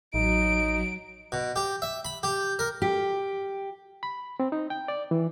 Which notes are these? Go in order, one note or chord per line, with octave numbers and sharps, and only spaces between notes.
A1 F#3 D#4 D7
B2
G4
E5
B5
G4
A#4
G4
B5
C4
D#4
G5
D5
E3